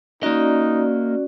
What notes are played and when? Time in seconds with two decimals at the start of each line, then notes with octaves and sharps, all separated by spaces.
0.23 A#3 C#4 D#4 F#4 D5 D#5